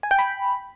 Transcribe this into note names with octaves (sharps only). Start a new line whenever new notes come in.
G#5
G5
B5